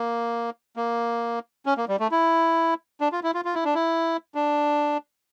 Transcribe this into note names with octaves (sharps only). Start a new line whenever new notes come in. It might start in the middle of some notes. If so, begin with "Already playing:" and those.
Already playing: A#3
A#3
C#4
A#3
G3
A3
E4
D4
F4
E4
F4
F4
E4
D4
E4
D4